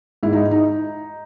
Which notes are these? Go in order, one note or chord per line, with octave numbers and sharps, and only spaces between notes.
G#2 E4
D#4
D#4